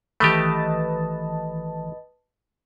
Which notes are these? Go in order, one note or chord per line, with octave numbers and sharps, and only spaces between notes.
G1 D#3 E3 A3 G4 B4 D#5 A5